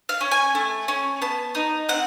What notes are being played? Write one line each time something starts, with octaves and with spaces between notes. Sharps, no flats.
F5
C#4
G#5
A3
C#4
B3 A5
D#4
C4 F#5